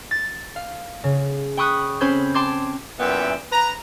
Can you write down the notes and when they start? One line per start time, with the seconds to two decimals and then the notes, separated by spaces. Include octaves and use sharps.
0.11 A6
0.56 F5
1.04 C#3
1.57 G5 B5 C#6 D#6 F#6
2.01 C4 C#4 C5 B5 G6 G#6
2.34 G5 A5 C6 D6 G#6
2.99 F#2 A#2 E3 B3 E5 G5
3.52 B4 A#5